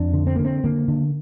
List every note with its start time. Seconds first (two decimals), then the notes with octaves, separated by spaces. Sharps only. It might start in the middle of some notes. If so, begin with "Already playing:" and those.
Already playing: F2 D4
0.13 D3
0.27 C4
0.36 D3 A#3
0.45 C4
0.64 D3 A#3
0.88 D3